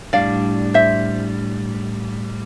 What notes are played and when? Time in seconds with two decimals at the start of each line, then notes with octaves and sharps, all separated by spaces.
0.13 A2 G3 D4 D5 F5
0.74 C5 E5